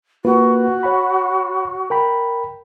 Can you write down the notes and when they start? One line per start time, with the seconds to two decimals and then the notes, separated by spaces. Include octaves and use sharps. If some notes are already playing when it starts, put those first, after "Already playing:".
0.25 A#3 F4 F#4 B4
0.83 C#5 F#5 B5
1.90 A#4 G5 B5